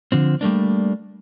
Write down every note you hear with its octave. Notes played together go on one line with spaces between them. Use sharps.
D3 F3 C4
G3 A3 A#3 D4